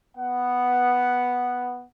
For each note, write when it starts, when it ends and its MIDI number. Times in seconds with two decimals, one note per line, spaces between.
0.18 1.85 59
0.18 1.85 78